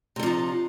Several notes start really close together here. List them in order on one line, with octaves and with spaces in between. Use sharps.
C3 D4 F3 D#4